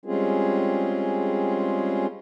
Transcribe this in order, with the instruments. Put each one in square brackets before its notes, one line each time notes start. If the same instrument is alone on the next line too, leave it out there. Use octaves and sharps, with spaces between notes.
[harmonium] G3 G#3 C4 C#4 F4 G#4